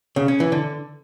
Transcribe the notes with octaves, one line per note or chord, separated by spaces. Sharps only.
C#3
C#4
E3
D3